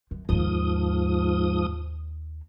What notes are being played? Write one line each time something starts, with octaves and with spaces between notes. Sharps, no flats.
F#2
D#2 G#2 F3 A#3 D#6